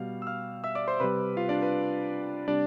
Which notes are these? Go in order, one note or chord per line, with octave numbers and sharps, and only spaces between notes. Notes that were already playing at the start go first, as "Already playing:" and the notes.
Already playing: B2 G3 F5
E6
F5 F6
E5 E6
D5 D6
C5 C6
C3 G3 B4 B5
F4 F5
D4 D5
B4
C3 G3 D4 D5